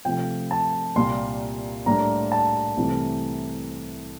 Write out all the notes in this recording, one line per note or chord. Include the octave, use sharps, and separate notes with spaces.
C3 F3 A3 C4 G5
A5
C2 A#2 G3 A#3 C6
A2 G3 A#3 D4 A#5
A5
C2 C3 E3 A3 C4